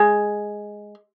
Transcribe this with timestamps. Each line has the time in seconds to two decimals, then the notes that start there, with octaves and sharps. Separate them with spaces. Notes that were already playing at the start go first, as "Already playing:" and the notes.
Already playing: G#3